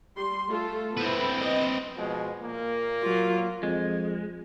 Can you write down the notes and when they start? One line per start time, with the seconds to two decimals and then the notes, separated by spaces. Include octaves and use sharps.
0.16 G3 C6
0.50 A3 F4 A4
0.97 B3 C4 E4 B4
1.40 D#5
1.97 B2 F3 G#3
2.42 A#2 A#3
3.03 F#3 F4
3.63 F2 G#3